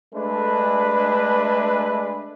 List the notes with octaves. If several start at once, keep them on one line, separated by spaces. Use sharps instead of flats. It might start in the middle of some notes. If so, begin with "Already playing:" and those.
G#3 A3 D4 A4 B4